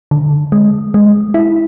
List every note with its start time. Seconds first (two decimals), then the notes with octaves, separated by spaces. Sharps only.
0.11 D3
0.52 G#3
0.94 G#3
1.34 E4